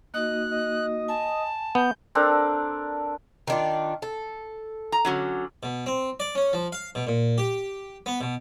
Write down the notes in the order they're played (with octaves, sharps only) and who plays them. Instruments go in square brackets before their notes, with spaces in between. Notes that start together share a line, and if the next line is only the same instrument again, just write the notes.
[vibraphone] A#3 D#4 F#4 [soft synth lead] D#5 [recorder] F#6
[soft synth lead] D#5
[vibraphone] G#5 [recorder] A5
[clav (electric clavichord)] B3 [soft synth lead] G6
[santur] C4 D4 A4 A#4
[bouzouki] D#3 D4 F4
A4
[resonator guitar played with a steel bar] A#5
D3 F#3 C#4
[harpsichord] B2
C4
D5
C#4
F3
F5
B2
A#2
G4
B3
B2